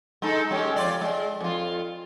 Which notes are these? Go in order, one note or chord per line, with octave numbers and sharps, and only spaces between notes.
G#3 D#4 A4
G#3 C#4 G4
F2 F4 D5
G#3
F2 F4